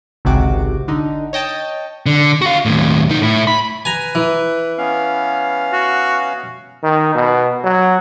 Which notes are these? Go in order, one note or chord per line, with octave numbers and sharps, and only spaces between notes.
G#1 C#2 C3 F#4 D6
D3 D#4
C#5 D#5 G5 A5
D3
F#4 F5
D#2 A2
C3 D#4
A2 E4
B5
B4 G#5 A#5
E3
B3 C#4 F5
F#4
D#3
B2
F#3